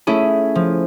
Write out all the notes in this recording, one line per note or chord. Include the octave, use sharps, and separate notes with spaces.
A3 C#4 E4 G#4
F3